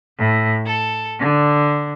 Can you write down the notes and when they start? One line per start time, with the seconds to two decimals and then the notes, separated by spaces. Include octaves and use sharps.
0.19 A2
0.67 A4
1.20 D3